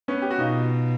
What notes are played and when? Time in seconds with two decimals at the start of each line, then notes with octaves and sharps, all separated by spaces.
0.08 B3 C#4
0.22 G4
0.31 F#4
0.38 B2 D#4 F4